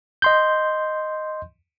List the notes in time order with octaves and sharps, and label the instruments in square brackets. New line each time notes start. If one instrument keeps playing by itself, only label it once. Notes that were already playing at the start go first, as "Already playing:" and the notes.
[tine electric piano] D#5 C6 G6